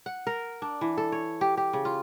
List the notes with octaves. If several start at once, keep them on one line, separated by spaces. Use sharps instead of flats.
F#5
A#4
D4
E3
A4
C#5
G4
G4
C#3
F4